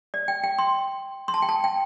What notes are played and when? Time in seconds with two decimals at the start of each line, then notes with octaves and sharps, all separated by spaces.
0.14 D5
0.28 G5
0.43 G5
0.58 C6
1.28 C6
1.34 A5
1.42 G5
1.49 A5
1.64 G5